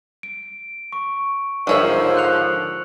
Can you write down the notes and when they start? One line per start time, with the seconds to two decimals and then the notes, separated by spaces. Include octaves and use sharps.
0.23 D7
0.92 C#6
1.67 G#2 D3 D#3 F3 C#5 E5 E6 F#7
2.17 F#6 C#7 F7